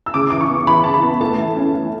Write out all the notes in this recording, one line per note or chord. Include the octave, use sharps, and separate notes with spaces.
E6
C#3 D6
E3 D6
C#6
B3
E3 B5
C#3 A5
B5
B3
A3 A5
E3
C#4
E3